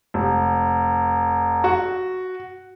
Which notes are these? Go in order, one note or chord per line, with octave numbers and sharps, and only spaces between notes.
F1
F#4